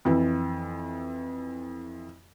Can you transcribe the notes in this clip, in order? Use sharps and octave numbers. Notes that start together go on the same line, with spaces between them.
F2 E3